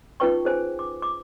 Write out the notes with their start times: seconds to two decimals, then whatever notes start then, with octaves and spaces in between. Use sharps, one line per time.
0.20 C#4 D#4 F4 B4 G5 C#6
0.45 G#4 C5 G#5
0.79 D6
1.02 D6